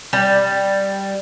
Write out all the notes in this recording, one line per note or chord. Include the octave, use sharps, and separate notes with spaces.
G3